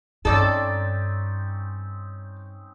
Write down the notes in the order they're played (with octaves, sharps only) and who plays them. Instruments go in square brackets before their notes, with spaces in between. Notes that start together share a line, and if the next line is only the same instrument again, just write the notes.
[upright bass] G2 [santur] C4 C#4 D#4 [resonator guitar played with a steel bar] A4 D5